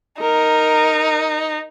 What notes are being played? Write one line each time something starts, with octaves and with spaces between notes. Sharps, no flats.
D#4 A#4